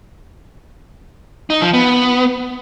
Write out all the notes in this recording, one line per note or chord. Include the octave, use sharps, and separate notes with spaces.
D#4
F3
B3